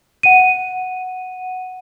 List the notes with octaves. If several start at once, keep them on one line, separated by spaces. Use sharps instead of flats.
F#5 D#7